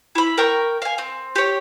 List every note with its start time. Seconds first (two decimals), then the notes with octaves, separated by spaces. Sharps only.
0.15 E4 B5
0.38 A#4 G5 C#6
0.82 F5 G#5
0.98 C4
1.36 G4 C#5